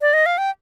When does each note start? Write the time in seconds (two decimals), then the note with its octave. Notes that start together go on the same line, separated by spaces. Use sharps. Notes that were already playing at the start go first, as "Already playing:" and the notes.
0.01 D5
0.13 D#5
0.26 F5
0.38 G5